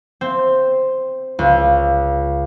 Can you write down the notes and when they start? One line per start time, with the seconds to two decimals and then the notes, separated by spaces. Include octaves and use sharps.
0.21 C4
1.39 C#2